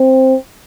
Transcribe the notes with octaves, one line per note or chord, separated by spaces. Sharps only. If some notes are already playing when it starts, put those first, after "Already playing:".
Already playing: C4